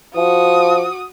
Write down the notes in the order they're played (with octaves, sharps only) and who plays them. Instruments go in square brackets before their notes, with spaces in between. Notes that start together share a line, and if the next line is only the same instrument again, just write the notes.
[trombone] F3 [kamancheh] F#4 D#6